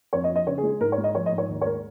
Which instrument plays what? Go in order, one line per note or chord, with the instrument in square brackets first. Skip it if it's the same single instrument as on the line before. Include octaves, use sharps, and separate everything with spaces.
[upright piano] F2 C#5
D#5
F3
D#5
C#3 C#5
G#4
G#3
G#4
G#2 A#4
C#5
G#3
D#5
F3 C#5
D#5
G#2
C#5
D#2
C#5
G#3 A#4